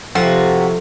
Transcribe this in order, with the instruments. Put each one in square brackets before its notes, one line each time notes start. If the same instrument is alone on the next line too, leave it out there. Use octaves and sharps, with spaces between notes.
[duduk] C3 [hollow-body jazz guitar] F3 [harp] F4 A4 [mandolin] F#4